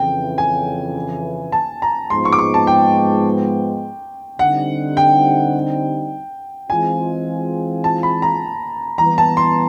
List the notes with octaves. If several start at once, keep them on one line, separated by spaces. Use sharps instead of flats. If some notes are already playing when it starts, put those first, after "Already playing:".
Already playing: F2 C#3 E3 G5
G#5
A5
A#5
G#2 F3 G#3 B3 C6
C#6
D6
C#6
A5
G5
D3 G3 C4 D#4 F#5
G5
E3 G#3 C4 F4 G#5
A5
B5
A#5
E3 G3 B3 A#5
A5
C6